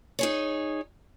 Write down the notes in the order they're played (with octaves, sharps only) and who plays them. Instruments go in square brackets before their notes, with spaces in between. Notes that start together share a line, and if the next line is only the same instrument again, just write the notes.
[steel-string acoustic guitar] D#4 G#4 C#5